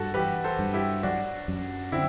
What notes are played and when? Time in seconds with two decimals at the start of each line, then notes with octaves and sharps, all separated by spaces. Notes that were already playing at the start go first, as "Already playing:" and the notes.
Already playing: G2 F#4 A4
0.14 E3 G4 B4
0.44 A4 C5
0.59 G2
0.73 E4 G4
1.03 F#3 D4 F#4
1.48 F#2
1.92 D3 C4 E4